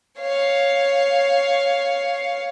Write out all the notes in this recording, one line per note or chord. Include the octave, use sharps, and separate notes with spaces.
C#5 F5